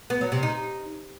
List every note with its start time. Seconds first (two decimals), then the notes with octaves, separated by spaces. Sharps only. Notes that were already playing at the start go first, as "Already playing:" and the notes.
0.10 B3
0.21 F#3
0.32 C3
0.43 D#4